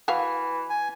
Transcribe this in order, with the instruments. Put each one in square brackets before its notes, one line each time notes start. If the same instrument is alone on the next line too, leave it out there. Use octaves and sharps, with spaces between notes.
[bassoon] E3 [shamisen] F#4 E5 F5
[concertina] G#5